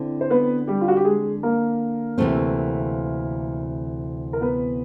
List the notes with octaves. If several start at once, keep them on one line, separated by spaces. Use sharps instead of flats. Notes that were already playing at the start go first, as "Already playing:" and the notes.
Already playing: D3 C4 E4
C5
B3 B4
G3 G4
F4
F#4
G4
G#3 G#4
A#3 A#4
D2 C3 E3 A3 C4
A#4
B3 B4